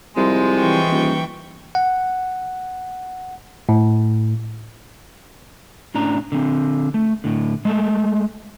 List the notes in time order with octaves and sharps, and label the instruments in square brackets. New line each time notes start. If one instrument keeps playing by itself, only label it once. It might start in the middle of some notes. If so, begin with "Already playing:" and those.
[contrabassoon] C2 [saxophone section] F3 G#3
[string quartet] E3 G5 C#6
[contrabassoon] D#1
[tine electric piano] F#5
A2
[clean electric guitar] A2 C#4 D4 A#5
D3 C4
A3
A2 D3
G#3 A3 A4